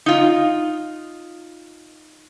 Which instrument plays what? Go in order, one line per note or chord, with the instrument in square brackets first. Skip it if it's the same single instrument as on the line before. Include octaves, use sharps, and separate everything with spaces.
[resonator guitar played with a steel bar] D#4 F4